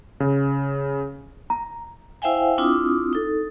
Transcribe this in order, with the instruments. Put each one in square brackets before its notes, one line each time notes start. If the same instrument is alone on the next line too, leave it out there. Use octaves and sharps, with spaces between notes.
[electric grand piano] C#3
[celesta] A#5
[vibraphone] E4 C5 E5 F5 G5 G#5
C4 D4 E4 F4 D6 D#6
D#4 A4